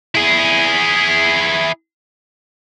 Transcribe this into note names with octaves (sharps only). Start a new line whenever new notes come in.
E4 G#4